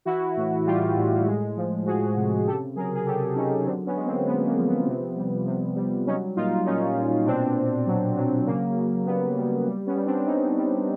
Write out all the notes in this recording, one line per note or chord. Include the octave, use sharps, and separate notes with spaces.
E3 E4 F#4
A2
G3 F4 G4
A2
G#3
F3
F3 F#4 G#4
C3
C#3 G4 A4
F#3 G#4 A#4
G#4
F#3 G4 A4
F#3 C#4 D#4
D3 C4 D4
B3 C#4
G#3
A#3 C4
G#3 B3
A#3
F3
B3
C3
G3
C3
G3
F#3 C#4 D#4
A#2 D#4 F4
A#2 C#4 D#4
A#2
B2 C4 D4
B2
F#3
F#3
C#3 A#3
C#3
G3 B3
G3
G3
B3 C#4
G3
C4 D4
G3 C#4 D#4
G3